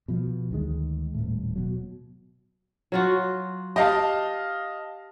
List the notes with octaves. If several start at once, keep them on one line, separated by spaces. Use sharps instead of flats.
B2 F3
D2 D#3 G#3
D#1 A2
B2 F#3
F#3 F4 F#4
G4 D#5 F5 A5